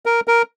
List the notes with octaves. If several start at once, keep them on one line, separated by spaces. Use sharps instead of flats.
A#4
A#4